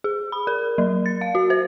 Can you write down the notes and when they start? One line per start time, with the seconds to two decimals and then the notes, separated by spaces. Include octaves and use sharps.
0.04 G#4
0.32 B5
0.47 A#4
0.78 F#3
1.06 A6
1.21 F5
1.35 F#4
1.50 C5